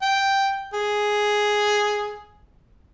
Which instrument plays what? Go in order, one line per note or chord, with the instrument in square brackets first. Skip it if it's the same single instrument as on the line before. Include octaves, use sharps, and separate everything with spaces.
[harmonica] G5
G#4